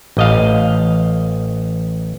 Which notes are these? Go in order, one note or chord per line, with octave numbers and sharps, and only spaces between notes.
A1 D#5 F5